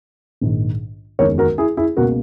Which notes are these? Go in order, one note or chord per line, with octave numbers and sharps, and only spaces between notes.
A#1 G#2 D#3
F#1 E2 D#3 G#3 A#4 C#5
F#4 A#4
E4 G#4
E4 G#4
C#2 B2 A#3 F#4 A#4